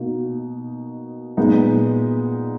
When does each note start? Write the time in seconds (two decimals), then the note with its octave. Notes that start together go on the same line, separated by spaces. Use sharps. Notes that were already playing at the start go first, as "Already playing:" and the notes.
Already playing: B2 A#3 D#4
1.37 A#2 G#3 B3 D#4